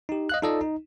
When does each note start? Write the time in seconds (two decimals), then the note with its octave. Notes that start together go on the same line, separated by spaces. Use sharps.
0.09 D#4 G4
0.29 D#5 F5 F#6
0.42 D#4 F4 A4 D5 D#5
0.61 D#4